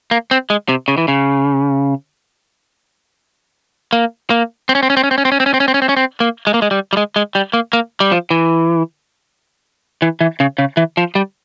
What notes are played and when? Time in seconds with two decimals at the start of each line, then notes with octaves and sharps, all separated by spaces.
0.11 A#3
0.31 C4
0.50 G#3
0.69 C3
0.88 C#3
0.98 E3
1.08 C#3
3.93 A#3
4.30 A#3
4.69 C4
4.75 C#4
4.83 C4
4.90 C#4
4.97 C4
5.04 C#4
5.11 C4
5.18 C#4
5.25 C4
5.32 C#4
5.40 C4
5.46 C#4
5.54 C4
5.60 C#4
5.68 C4
5.74 C#4
5.82 C4
5.89 C#4
5.97 C4
6.20 A#3
6.47 G#3
6.54 A#3
6.62 G#3
6.71 G3
6.93 G3
6.97 G#3
7.16 G#3
7.35 G3
7.53 A#3
7.73 A#3
8.00 G3
8.12 F3
8.31 E3
10.02 E3
10.21 E3
10.40 C#3
10.58 C#3
10.77 E3
10.97 F3
11.15 G3